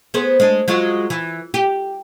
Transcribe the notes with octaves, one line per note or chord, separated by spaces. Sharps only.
B3 G#4 C5
G#3 D4
F#3 G#3 F4
E3
G4